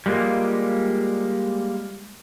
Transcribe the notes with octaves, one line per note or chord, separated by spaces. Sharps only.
G3 G#3 A#3 F4